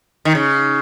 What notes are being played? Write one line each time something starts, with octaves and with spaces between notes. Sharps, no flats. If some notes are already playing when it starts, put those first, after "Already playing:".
D#3
C#3